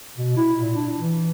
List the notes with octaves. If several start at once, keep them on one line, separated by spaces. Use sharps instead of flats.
B2
E4
A#2
D4
E3